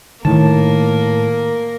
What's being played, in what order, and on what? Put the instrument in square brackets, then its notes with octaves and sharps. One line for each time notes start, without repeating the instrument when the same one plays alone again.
[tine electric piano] A2 A5 [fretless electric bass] D#3 [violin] A#3 A#4